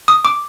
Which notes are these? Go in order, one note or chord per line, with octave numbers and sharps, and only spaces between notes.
D#6
D6